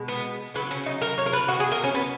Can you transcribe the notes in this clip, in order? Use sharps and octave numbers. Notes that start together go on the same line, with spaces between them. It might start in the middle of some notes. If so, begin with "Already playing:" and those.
Already playing: B2 G#3
B3
C#3 F#3 B3
C#4
D#4
A#4
C#5
A#4
B4
B2 F#3 F#4
G#4
A#4
C#4
B3